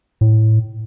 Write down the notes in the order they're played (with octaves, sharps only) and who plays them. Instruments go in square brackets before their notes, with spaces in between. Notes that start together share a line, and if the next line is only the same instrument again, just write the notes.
[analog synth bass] A2